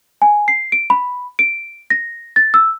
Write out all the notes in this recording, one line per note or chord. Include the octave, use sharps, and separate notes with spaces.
G#5
C7
D7
B5
D7
A#6
A6
E6